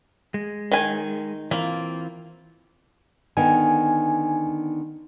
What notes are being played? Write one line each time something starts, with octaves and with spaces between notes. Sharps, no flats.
G#3
D#3 G#5
E3 A#3 C4 F4
D3 D#3 B3 G#5